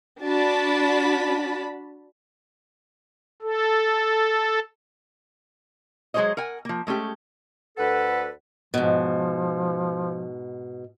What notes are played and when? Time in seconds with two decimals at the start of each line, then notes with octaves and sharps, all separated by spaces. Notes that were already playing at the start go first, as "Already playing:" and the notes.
0.23 D4 F#4 A5 B5
3.42 A4
6.14 F#3 G#3 G#4 C5 C#5 D#5
6.37 A#4 F#5 G#5
6.65 F3 A#3
6.87 G#3 A3 C#4 G4
7.77 D2 A4 B4 F#5
8.74 G#2 B2 F3